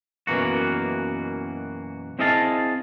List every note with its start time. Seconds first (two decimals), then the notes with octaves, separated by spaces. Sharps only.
0.27 F#2 B2 E3 A#3 F#4
2.19 C4 E4 G#4 D#5 F5 A5